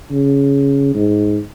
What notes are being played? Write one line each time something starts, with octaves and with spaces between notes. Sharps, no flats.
C#3
G#2